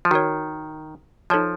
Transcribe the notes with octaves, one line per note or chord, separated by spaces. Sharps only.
F3
D#3 F#4 A#4 C#5
F3 D#4 A4 C#5 A5